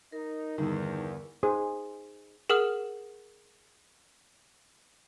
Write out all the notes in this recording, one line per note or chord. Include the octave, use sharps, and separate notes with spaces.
D#4 A#4
E2 G2 D3 D#3
D#4 G#4 C5 D#6
G#4 A#4 F#5 D#6 F6